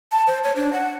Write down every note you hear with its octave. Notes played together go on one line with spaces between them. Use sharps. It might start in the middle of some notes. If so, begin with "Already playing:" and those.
A5
C5
C#5
D4
F#5